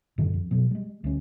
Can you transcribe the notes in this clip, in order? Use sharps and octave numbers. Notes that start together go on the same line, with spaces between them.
F#2 A2 D3 D#3
F2
B2 F#3
G3 G#3
D2 C#4